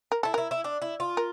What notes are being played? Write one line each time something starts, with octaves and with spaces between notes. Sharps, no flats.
A#4
E4 A4
E4 A#4
E4
D4
E4
F4
A#4